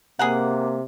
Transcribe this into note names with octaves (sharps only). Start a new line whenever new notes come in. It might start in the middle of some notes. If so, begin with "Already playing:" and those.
C3 A#3 G#4 A#4 F#5